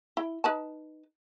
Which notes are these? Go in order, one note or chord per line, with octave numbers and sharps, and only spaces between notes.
E4
D#4 B4 A5